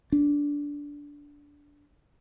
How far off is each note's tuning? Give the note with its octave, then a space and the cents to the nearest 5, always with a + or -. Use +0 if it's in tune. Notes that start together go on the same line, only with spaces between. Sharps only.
D4 -15